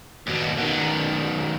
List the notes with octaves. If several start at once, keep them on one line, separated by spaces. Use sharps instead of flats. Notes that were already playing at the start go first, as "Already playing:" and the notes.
D#2 B2
B2 D#3